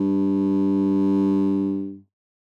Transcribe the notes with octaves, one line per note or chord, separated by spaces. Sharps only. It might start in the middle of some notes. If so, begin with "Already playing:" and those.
Already playing: G2